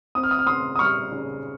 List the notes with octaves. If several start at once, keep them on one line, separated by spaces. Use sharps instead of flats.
C4 D#6
F6
D#6
F6
C#3 C6 D#6
D#6
G3 C#6 F6
C#3